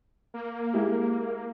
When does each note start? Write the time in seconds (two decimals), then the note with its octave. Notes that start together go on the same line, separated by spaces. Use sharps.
0.34 A#3
0.74 G#3 E4 G4